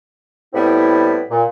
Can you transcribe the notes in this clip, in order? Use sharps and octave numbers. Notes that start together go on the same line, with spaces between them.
A2 G3 B3 C4 E4
A#2